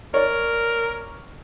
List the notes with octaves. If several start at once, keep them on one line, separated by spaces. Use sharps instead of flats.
A#4 C#5 D5